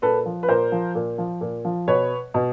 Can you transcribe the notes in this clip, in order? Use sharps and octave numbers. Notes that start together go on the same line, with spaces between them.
A#2 A4 B4
F3
B4
A#2 A#4 C5
F3
A#2
F3
A#2
F3
B2 B4 C#5
B2